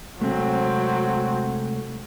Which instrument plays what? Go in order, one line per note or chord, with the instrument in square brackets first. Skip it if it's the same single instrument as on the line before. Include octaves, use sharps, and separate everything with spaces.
[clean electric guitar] C3 G#3 A3 [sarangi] F#3 [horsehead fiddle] C4